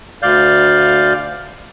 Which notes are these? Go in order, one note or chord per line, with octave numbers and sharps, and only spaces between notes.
D2 D5 F5 G6